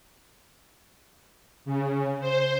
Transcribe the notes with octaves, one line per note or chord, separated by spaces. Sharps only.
C#3
C5